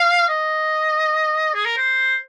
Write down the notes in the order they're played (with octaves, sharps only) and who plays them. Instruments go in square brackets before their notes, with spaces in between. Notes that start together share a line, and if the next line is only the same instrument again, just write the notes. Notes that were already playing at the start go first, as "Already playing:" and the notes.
Already playing: [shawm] F5
D#5
G#4
A#4
C5